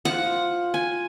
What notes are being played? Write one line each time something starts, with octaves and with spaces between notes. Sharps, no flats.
F4 C5 F#5
G#5